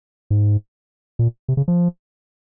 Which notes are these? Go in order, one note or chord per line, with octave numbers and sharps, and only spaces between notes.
G#2
A#2
C3
C#3
F3